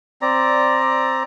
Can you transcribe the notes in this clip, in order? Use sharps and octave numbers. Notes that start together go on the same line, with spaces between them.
C4 D5 A#5